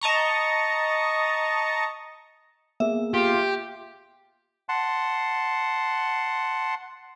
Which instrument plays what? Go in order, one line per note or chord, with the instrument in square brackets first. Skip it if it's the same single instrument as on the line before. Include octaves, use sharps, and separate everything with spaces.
[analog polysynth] D#5 A5 A#5 C#6
[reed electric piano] A#3 B3 G#4 [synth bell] E5
[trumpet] F4 [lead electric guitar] G4
[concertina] F#5 A5 C6